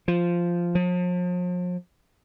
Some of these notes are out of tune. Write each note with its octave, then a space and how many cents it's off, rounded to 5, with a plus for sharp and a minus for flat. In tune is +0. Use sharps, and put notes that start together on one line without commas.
F3 -5
F3 +40